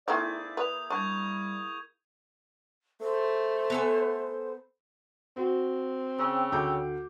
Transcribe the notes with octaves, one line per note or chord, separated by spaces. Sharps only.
D#3 A3 A#3 C4 E4 G#4 D5 G6
B4 D#6 F7
G3 D4 C#6 G6 G#6
A3 C5
B3 A4 G#5
C4 F#4
C#3 G5 E6
D2 D6 G6